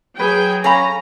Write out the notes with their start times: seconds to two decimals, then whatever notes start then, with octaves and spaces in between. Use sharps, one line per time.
0.19 F#3 G#4 B4 G5
0.64 C#4 A4 F5 A#5 B5